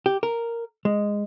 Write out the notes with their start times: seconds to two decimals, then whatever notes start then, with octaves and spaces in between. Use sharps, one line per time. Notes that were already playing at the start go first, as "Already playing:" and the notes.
0.06 G4
0.23 A#4
0.85 G#3